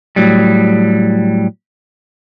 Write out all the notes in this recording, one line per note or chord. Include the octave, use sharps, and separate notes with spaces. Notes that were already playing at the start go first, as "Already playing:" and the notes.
A2 F#3 G3